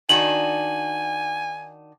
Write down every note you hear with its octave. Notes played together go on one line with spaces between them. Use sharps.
D#3 D4 F#4 G#5 F#7